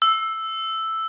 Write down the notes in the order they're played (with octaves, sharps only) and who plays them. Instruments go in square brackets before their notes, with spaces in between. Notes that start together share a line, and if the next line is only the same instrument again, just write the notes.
[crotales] E6